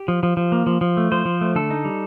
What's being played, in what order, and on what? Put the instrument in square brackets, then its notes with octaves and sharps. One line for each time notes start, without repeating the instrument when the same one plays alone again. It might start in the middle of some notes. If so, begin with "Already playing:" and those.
Already playing: [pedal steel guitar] G4
F3
F3
F3
A#3
F3
F3
A3
F3 C5
F3
A3
D3 A4
D#4
G3